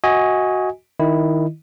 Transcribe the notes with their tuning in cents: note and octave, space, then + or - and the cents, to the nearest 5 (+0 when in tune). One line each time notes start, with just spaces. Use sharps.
F#4 +0 D#5 +25 G#5 -10
D#3 +0 E4 +0 D#5 -15